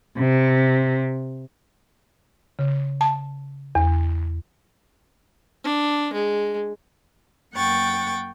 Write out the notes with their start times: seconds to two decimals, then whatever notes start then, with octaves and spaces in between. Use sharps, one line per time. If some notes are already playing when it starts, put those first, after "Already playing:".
0.17 C3
2.59 C#3
3.01 A5
3.75 E2
5.64 D4
6.13 G#3
7.54 F#2 A#3 F#5 G5 C#6 A6